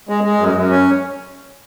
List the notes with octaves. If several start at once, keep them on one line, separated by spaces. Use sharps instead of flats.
G#3
G#3
F#2
F#2
C#4